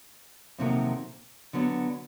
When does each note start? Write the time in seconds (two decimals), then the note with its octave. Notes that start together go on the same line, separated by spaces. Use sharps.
0.58 F2 C3 D#3 F#3 A#3
1.53 D3 F#3 B3